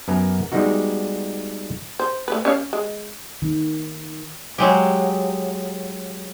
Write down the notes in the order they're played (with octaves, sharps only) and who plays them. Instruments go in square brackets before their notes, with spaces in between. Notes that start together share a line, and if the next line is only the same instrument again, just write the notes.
[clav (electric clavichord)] F#2 B3 A#4 G#5 A#5
G3 G#3 B3 D#4 F#4
[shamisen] C5
A3 B4
C#4 C#5 F5
G#3
[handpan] D#3
[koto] F#3 G#3 G4